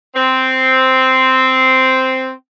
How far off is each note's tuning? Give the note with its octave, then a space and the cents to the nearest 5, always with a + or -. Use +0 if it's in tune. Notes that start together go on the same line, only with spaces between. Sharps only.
C4 -5